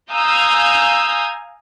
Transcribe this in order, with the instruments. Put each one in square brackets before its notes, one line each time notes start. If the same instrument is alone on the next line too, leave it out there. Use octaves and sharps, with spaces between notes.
[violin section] F5 G#5 A#5 D#6 E6 G6